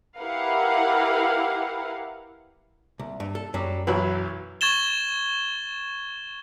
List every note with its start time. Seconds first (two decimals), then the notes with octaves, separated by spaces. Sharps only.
0.18 E4 G4 A#4 B4 F5 F#5
2.99 C2
3.20 G2
3.35 A4
3.54 F#2 F#3 G3
3.87 B1 E3 F#3 B4
4.61 C#6 G#6 A6 E7 G7